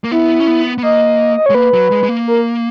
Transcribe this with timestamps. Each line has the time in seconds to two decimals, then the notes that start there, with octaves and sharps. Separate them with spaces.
0.04 A#3
0.11 B3 E4
0.40 C#4
0.47 B3
0.78 B3
0.83 A#3 D#5
1.37 D#5
1.46 G#3 C#5
1.55 A#3 B4
1.74 F#3
1.91 G#3
2.03 G#3
2.09 A#3
2.28 A#4